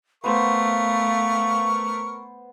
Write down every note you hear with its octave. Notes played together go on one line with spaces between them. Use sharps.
A3 B3 A#4 C5 F5 C#6